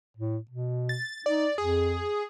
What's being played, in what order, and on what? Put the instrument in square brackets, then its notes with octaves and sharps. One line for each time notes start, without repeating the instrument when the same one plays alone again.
[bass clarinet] A2
B2
[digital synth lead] A6
[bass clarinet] D#4 [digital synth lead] D5
[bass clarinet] F2 [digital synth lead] G#4